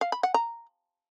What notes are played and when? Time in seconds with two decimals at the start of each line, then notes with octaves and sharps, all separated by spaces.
0.01 F5
0.12 B5
0.23 F#5
0.34 A#5